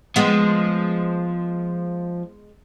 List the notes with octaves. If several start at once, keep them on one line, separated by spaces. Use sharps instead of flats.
F3 G#3 B3